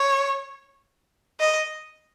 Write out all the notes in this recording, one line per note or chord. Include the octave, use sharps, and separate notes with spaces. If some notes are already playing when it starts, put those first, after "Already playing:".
Already playing: C#5
D#5